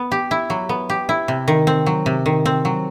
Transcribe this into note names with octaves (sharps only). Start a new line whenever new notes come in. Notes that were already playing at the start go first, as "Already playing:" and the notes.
Already playing: B3
G4
E4
F#3
B3
G4
E4
C3
D#3
C4
F#3
C3
D#3
C4
F#3